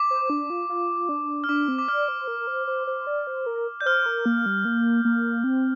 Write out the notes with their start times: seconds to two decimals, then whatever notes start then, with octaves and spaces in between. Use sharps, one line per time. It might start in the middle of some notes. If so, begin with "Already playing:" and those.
Already playing: D6
0.10 C5
0.30 D4
0.50 F4
0.69 F4
1.09 D4
1.44 F6
1.49 D4 D6
1.68 C4
1.79 D6
1.88 D5 F6
2.08 C5
2.28 A#4
2.47 C5
2.67 C5
2.87 C5
3.07 D5
3.27 C5
3.46 A#4
3.81 D5 G6
3.86 C5 F6
4.06 A#4
4.26 A#3
4.46 G3
4.65 A#3
5.05 A#3
5.44 C4